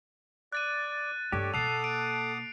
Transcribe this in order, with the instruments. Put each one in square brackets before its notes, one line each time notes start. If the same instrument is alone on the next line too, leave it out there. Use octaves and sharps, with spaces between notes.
[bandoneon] D5 [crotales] F#6 A6 D#7
[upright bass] G2 A3 [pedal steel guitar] G4 [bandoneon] A4 C#5 D5
[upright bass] B2 A#3 [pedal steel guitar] A4 [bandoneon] F#5 D6 D#6 [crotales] C7 F7
[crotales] D7